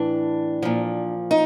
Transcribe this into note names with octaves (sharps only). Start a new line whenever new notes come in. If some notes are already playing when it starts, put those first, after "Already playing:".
Already playing: A2 E3 D4
A#2 F3
D#4